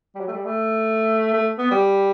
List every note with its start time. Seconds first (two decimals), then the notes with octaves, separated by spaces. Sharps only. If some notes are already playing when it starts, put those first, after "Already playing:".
0.15 G3
0.20 F#3
0.28 A3
0.32 G3
0.45 A3
1.33 A3
1.58 B3
1.71 G3